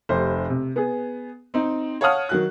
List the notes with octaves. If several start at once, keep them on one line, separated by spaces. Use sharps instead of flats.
F1 G4 C5
C3
B3 G#4
C4 D#4
C#5 F5 F#5 A5 D#6 F6
D#3 F#3 F#6